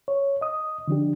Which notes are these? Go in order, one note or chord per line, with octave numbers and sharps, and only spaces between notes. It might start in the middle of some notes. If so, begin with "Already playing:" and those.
C#5
D#5 D#6
D3 F3 D4 G4